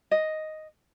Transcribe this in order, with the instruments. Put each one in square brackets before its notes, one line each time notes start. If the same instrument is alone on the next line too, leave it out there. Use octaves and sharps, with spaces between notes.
[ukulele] D#5